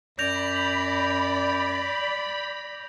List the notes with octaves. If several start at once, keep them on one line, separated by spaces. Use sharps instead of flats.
F#2 D5 B5 G6 A#6 F7